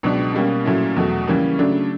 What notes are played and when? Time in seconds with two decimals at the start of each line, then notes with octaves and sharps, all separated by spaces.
0.03 C#2 B2 F#3 B3 D4
0.34 B2 G3 A#3 C#4
0.65 A#2 F#3 A3 C#4 E4
0.96 E2 B2 F#3 A3
1.28 C#3 E3 G3 A#3 C#4
1.59 C#3 F#3 A3 D4